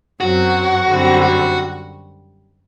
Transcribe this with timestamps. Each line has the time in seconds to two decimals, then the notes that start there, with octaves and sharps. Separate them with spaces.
0.20 F#2 F#3 C4 F#4
0.89 F#2 D3 G3 C4
1.22 F#4